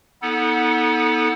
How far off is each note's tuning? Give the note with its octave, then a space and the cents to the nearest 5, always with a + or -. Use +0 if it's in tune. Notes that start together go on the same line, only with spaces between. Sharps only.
B3 -10 D#4 +45 A4 +0